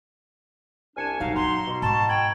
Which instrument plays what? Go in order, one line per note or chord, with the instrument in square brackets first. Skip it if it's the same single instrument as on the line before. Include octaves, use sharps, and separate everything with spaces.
[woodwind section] C2 D4 G#5 [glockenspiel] F6 C#7 E7
[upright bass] A#1 F#2 [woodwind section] F#3 D#4 [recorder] F5
[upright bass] B3 [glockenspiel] A#5 [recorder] C6
[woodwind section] B2
[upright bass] G#2 [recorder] A5 [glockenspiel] B5 C#6
[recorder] G5 [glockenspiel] G#6 F#7 G7